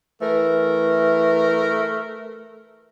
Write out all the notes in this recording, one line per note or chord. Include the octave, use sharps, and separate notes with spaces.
E3 A3 A#4